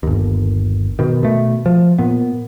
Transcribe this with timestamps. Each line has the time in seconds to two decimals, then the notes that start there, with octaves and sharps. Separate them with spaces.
0.03 G1 D#2
0.99 B2 D#3
1.23 B2 A3
1.66 F3
1.99 A#2 B3